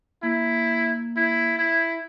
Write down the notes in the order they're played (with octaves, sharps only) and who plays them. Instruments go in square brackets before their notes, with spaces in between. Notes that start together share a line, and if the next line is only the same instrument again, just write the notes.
[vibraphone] A#3 [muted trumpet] E4
[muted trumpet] E4
E4